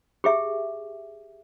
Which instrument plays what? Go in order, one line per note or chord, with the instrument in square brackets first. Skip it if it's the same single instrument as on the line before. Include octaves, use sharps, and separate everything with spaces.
[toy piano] G4 G#4 E5